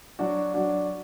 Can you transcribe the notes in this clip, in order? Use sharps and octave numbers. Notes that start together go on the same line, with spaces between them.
F#3 D4 F#4
F#3 D4 F#4